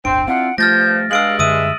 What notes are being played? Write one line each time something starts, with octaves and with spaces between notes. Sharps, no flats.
D1 G1 C4 D4 D7
C4 D4 E4 F4 F#5
G2 F3 A3 F6 G6 A6 A#6
G2 G#3 F5 E6 D7 F#7
F#2 D3 E5 D#6 E6 D#7